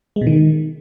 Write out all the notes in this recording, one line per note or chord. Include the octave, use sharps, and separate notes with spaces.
G#3
B2
D#3